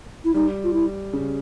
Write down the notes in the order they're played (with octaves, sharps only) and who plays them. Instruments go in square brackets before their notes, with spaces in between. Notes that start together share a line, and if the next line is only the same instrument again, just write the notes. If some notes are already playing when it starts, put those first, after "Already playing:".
[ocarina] E4
[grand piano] G3 [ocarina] D#4
[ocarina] F4
E4
[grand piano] C#3